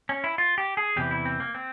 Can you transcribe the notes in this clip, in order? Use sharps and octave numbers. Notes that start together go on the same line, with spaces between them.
C#4
E4
F4
G4
G#4
E2 C3 E3 G4
E4
C4
A#3
C4